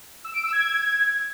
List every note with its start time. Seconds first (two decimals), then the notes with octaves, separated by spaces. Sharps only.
0.24 E6
0.34 D7
0.43 E6
0.53 G#6